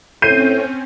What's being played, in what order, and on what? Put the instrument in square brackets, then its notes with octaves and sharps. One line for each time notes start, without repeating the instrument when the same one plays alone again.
[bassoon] A2 [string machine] C4 C#4 [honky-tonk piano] G6 C7 D#7